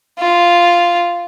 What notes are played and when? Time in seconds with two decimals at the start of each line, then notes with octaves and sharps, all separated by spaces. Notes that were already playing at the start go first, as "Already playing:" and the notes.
0.19 F4